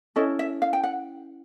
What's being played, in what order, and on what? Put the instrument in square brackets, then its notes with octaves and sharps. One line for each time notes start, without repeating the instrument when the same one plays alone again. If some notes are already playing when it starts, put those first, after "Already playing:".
[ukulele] C#4 E4 A4 D#5
E5
F5
G5
F#5